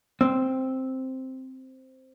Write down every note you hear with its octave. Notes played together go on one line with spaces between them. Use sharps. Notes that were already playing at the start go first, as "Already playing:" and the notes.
C4